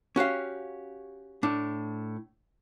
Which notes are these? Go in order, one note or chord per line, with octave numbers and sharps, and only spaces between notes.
C#4 F#4 G4 F5
A2 D4